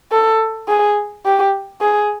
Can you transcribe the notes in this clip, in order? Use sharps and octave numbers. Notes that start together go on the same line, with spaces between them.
A4
G#4
G4
G#4